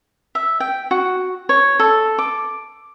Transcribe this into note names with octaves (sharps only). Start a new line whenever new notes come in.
E5
G5
F#4
C#5
A4
D6